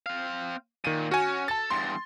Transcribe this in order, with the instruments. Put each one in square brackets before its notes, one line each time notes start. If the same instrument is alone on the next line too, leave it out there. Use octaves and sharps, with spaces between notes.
[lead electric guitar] C4 F5
[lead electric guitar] A#2 [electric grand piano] D#3 D#7
[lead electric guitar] C#4 [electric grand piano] F#4 G#5
[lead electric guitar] A4 [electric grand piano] A5 A6
[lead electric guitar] E2 G2 [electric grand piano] C6